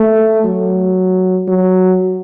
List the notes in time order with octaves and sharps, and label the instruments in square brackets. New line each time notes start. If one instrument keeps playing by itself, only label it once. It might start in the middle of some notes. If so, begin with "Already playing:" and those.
Already playing: [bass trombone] A3
F#3
F#3